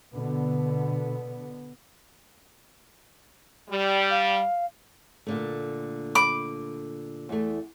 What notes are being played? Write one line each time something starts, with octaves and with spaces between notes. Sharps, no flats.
B2 D3 B3
G3
F5
A#2 D3 A3
B5 D6
E2 A3